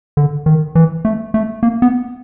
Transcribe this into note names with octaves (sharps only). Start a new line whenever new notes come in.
D3
D#3
E3
A3
A3
A#3
B3